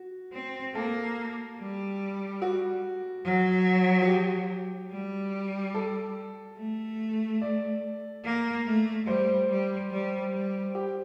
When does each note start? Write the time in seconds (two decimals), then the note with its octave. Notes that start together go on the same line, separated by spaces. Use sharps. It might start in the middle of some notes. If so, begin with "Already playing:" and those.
Already playing: F#4
0.33 C4
0.74 A#3 A4
1.58 G3
2.42 F#4
3.24 F#3
4.02 F#4
4.07 G4
4.91 G3
5.74 A4
6.57 A3
7.42 D5
8.24 A#3
8.66 A3
9.07 G3 C5
9.49 G3
9.91 G3
10.32 G3
10.75 G4